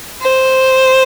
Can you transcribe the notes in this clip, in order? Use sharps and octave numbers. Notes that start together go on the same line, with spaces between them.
C5